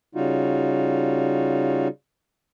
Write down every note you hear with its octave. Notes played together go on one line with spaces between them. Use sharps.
C#3 G3 D#4 F4 F#4